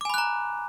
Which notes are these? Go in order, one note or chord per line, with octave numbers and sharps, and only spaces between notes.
G#5 A#5 B5 D6 F#6